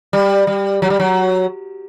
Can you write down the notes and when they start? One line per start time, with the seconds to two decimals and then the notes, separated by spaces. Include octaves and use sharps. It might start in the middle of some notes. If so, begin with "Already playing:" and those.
0.13 G3
0.47 G3
0.82 F#3
0.90 G3
1.00 F#3